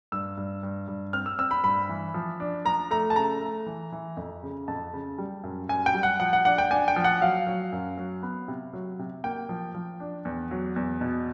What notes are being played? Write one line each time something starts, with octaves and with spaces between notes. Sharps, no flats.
G2 E6
G2
G2
G2
C4 F6
E6
C4 E6
B5
G2 B5
E3
F3
D4
F3 A#5
A3 A#5
A5
C#3 A#5
A3
E3
E3
F2
C#3
F2 A5
C#3
G3
F#2
F#2 G#5
G5
G3
F#5
F3 F#5
F#5
D4 F#5
G5
D4 G#5
G5
F3
F#5
F#3 F5
F#3
F#2
F#3
B3
C3
F#3
C3
A#3 G5
F3
F3
D4
E2
F#3
E2
B2